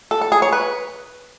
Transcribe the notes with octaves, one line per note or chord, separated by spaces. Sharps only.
A4
A4
G#4
C#5
B4